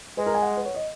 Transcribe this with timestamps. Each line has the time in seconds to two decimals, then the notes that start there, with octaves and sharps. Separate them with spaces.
0.17 G#3 B4
0.26 A#4
0.35 G#5
0.42 F#5
0.57 B4
0.65 C#5
0.74 D#5